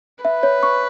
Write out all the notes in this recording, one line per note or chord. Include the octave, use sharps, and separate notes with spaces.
B4 E5
C#5
C#6